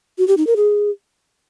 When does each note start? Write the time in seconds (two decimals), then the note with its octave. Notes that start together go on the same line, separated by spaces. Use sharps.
0.18 F#4
0.28 G4
0.37 D#4
0.47 A#4
0.56 G#4